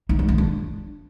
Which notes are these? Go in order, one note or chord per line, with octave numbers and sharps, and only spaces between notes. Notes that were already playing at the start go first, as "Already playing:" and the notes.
D#4
G#3
C#4
D4